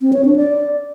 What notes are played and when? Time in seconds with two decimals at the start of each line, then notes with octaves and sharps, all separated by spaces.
0.02 C4
0.13 C#5
0.25 D4
0.36 D5